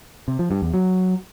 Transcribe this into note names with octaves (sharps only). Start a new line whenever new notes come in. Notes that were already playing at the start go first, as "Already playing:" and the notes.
C3
F3
G2
E2
F#3